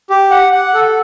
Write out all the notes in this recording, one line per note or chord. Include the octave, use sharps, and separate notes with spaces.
G4
F#5
F#5
A4